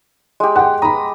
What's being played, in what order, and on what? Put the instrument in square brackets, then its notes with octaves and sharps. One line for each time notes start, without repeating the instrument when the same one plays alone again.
[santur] G#3 G4
[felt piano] F#5 G5
[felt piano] A#5 B5 [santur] D#6